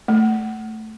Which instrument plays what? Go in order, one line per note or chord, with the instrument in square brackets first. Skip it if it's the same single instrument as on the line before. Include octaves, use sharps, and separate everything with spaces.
[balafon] A3